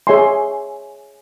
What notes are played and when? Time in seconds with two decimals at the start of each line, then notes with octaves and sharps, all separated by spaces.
0.07 G#4 C#5 E5 G#5 C6